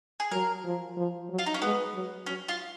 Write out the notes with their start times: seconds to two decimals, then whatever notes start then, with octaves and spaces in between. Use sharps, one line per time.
0.20 G#4
0.31 F#3 A#4
0.64 F3
0.97 F3
1.29 F#3
1.39 F4
1.46 D#4
1.54 C#4
1.62 G#3 B3
1.94 F#3
2.26 F#3 C#4
2.48 F4